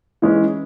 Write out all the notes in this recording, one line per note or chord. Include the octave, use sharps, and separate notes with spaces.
E3 G#3 C#4 G#4